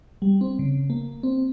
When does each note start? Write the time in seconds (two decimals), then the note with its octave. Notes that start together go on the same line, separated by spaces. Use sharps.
0.22 G3
0.41 C4
0.59 C#3
0.90 A#3
1.23 C4